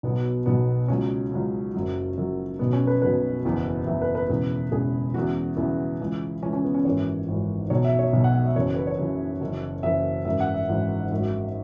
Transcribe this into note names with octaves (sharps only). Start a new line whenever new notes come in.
B1 B2 F#3 B3
B1 B2 F#3 B3
C#2 C#3 F#3 C#4
C#2 C#3 F#3
F#1 F#2 F#3
F#1 F#2 F#3
B1 B2 F#3 B3
C#4
B4
B1 B2 F#3 B4
F#1 E2 E3
F#1 E2 E3 E5
B4
B4
E1 E2 C#3 E3
E1 E2 C#3 E3 G#4
E2 C#3 E3 F#4
E2 C#3 E3 E4
C#2 C#3 E3
C#2 C#3 E3 C#4
C#4
B3
C#4
G#1 F#2 E3 C#5
G#1 F#2 E3
B1 B2 F#3 C#5
E5
C#5
B1 B2 F#3
F#5
F#5
E5
F#1 F#2 C#3 E3 C#5
B4
C#5
F#1 F#2 C#3 E3
F#1 F#2 E3
F#1 F#2 E3 E5
G#1 F#2 E3 E5
F#5
E5
G#1 F#2 E3
G#1 F#2 F#3